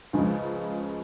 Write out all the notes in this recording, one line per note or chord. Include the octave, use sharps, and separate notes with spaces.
C#2 C#3 F3 G#3